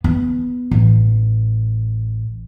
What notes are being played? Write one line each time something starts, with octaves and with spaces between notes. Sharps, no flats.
B3
A1